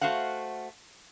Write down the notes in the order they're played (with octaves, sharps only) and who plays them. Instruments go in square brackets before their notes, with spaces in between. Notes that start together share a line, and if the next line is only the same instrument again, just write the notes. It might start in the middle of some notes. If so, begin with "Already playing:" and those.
[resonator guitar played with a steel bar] A3 F#4 C5 F5 F#5